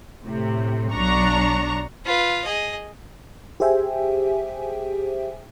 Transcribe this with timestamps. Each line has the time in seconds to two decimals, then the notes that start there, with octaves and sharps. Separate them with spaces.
0.25 A2 C3
0.92 B1 F#3 D4 A#5 C#6
2.06 F4 B4
2.45 G#4 D#5
3.60 G4 G#4 C5 E5 G5 G#5